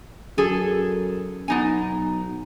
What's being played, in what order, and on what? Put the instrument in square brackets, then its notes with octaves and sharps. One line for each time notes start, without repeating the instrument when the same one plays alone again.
[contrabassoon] F#2 [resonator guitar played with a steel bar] G#4 A4
[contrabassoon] B1 [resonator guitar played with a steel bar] B3 D#4 G#5